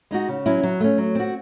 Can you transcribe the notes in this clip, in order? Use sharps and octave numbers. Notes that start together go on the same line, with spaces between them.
G#3 D#4 F#4
C#3
F#3 C#4 E4
F#3
A3 C#4
F#3
C4 F#4